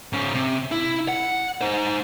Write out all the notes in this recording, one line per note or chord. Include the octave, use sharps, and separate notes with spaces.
G#2 C#4
C3
E4
F#5
D#4 C5